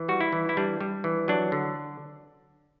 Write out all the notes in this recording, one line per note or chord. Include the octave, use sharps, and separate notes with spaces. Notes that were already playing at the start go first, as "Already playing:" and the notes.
Already playing: E3
G3 F#4
E4
E3
E4
G3 D4
G3
E3
F#3 D4
D3